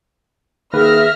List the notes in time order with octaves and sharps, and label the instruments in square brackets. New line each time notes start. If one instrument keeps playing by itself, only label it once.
[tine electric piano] D#3 A#3 B4 [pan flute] G#4 [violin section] E5 F6 A#6